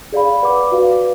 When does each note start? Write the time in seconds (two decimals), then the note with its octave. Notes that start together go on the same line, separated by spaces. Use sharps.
0.12 G#4 D5 F5 B5
0.42 B4 D5 F#5 D6
0.72 F#4 B4 D5 F5